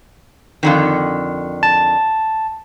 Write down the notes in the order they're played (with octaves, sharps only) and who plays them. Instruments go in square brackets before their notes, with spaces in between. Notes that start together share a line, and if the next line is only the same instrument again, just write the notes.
[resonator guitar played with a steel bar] F2 D3 D#3
[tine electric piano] A5